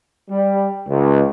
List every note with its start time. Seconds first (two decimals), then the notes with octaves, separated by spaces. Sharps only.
0.30 G3
0.88 C#2